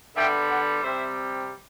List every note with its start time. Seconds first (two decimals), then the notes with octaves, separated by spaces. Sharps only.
0.15 D3 G3 B3 E5 G5
0.50 D5 F#5
0.83 C3 G3 C4 C5 E5